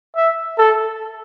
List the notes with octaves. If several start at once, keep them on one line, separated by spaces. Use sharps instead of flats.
E5
A4